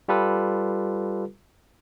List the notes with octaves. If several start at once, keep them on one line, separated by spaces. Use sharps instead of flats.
G3 F4 G4 A4 B4